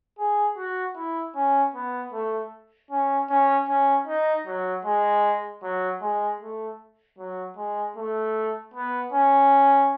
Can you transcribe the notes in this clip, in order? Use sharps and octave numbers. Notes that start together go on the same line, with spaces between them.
G#4
F#4
E4
C#4
B3
A3
C#4
C#4
C#4
D#4
F#3
G#3
F#3
G#3
A3
F#3
G#3
A3
B3
C#4